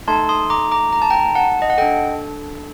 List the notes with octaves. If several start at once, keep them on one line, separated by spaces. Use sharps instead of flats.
A3 D#4 A4 A5 C6
C6 D#6
A#5 D6
A#5 D6
A#5
A5
G5 A#5
F#5 A5
D#5
F#5
D4 A4 D#5 G5